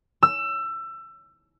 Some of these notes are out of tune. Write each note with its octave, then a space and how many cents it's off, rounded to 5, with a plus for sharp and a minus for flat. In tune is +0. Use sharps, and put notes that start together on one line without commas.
E6 +25